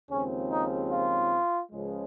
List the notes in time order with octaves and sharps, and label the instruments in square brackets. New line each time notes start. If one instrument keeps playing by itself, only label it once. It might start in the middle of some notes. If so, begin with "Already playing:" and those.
[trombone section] D#2 C#3 F3 G#3 C4 C#4
D#4
F4
C#2 C#3 F3 G#3